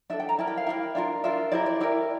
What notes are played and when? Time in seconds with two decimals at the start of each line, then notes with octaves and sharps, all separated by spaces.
0.10 D4 A4 E5
0.20 G5
0.29 A#5
0.39 E4 G4 A#4 A5
0.47 G5
0.57 F5
0.67 E4 G4 A#4
0.95 D4 F4 A#4
1.24 D4 F4 A#4 E5
1.52 E4 G4 A#4 D5
1.66 D5
1.80 E4 G4 A#4 D5